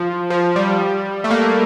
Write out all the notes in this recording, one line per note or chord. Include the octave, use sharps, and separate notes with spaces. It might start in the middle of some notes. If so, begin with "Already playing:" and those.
Already playing: F3
F3
G3
A3
A#3